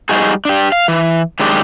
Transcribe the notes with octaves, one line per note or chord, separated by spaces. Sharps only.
G3 D#4 F#4 G#4
D4 G4
F5
E3
D#3 F#3 G#3 D4 G4